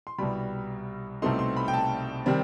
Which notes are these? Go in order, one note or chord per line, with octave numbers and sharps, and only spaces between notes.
C6
C2 B2 G3 B5
C2 B2 A3 C4 D#4 C6
C6
B5
G5
A5
C3 D#3 G3 C4